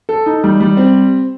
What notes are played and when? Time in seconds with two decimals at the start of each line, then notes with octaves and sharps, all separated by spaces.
0.09 A4
0.26 D#4
0.44 G3
0.60 G3
0.77 C4